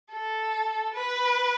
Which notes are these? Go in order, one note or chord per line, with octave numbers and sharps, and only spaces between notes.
A4
B4